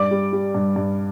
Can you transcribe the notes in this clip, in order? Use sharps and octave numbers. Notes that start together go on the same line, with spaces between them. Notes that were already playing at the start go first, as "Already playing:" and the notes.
Already playing: G2 D5 D6
G3
G3
G2
G2